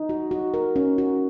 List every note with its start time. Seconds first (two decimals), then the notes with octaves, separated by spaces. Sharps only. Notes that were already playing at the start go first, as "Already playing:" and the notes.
Already playing: D#4
0.09 F#4
0.31 F#4
0.54 A#4
0.76 C#4
0.98 F#4